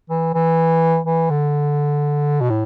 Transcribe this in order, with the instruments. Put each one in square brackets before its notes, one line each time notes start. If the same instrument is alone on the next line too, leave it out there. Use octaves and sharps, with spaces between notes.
[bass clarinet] E3
E3
E3
D3
B2
A2